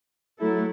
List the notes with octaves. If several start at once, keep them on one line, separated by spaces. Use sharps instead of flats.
F#3 A3 E4 A4